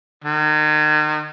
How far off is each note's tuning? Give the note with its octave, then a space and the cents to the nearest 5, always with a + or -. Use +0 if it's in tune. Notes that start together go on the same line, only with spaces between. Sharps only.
D#3 -35